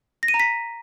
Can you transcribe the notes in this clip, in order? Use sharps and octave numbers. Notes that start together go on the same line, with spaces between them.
A#6
D#7
A#5
B6